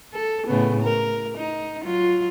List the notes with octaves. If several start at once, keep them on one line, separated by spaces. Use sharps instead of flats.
A4
A2 C#3 B3
A#4
D#4
F#3 F4